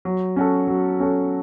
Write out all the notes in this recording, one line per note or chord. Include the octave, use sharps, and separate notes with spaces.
F#3
C#4 F#4 A4
F#3
C#4 F#4 A4